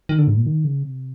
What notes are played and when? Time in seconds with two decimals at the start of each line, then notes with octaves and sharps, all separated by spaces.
0.09 D#3
0.19 D3
0.28 G#2
0.37 A#2
0.46 D#3
0.64 C#3
0.83 C3